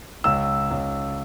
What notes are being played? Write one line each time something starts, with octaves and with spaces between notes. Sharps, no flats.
C#2 E6
C#2